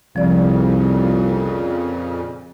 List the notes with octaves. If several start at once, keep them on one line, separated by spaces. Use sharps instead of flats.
C2 F2 A#2 C#3 F3 D5